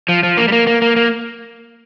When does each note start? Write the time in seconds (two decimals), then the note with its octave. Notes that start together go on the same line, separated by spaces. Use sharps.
0.09 F3
0.23 F3
0.37 A#3
0.48 G3
0.52 A#3
0.67 A#3
0.82 A#3
0.96 A#3